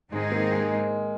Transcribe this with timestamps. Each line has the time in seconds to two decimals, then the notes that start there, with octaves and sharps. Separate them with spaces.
0.11 G#2 D#3 G#3 C4 D#4 G#4
0.31 A#3
0.52 G#3